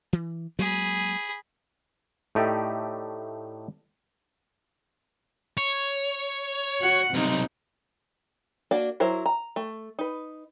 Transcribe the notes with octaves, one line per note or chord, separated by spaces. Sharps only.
E3
F#3 G#3 A#3 G#4 B5
A2 A3 D#4 G4 D5 E5
C#5
F#4 F#5
B1 C3 C4 D#4
A#3 D4 F#4
F#3 E4 A#4 C5
A#5
A3
D#4 B4